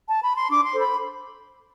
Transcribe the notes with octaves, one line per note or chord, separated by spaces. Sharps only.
A5
B5
C6
D4 D6
C6
A4 C5
B5